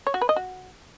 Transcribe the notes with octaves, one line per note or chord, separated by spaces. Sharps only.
C#5
F#4
B4
D#5
F#4